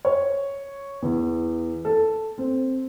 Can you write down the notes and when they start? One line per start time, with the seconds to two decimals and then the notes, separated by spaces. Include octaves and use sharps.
0.05 C#5
1.02 E2
1.85 A4
2.38 C4